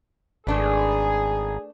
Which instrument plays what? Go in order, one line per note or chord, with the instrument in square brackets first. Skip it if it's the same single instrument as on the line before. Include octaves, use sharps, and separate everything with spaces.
[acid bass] G#1 [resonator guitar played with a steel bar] A3 D4 B4 [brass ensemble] G#4